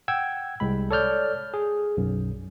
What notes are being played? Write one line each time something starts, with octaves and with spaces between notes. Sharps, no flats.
F#5 G5 E6 G#6
C2 G#3 B5
A4 C#5 D5 F6 G6
G#4
B1 F#2